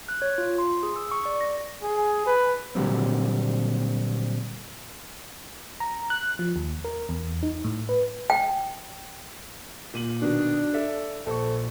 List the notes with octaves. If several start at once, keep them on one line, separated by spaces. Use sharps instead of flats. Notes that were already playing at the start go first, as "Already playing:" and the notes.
F#6
C#5
F4
C6
G#4
E6
C#6
D5
A#6
G#4
B4
A#2 D3 F#3 G3 C4
A#5
F#6
F3
D#2
A#4
E2
D#4
A2
B4
G5
A#2 D#7 F#7
B2 D#3 D4
A4 D5 E5
A#1 A4 C5 C#6